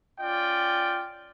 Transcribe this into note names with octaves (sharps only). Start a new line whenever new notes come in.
C#4 F4 D5 G5